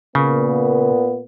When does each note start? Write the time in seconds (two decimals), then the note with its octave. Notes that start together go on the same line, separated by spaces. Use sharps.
0.15 A#2 C#3 A#3 B3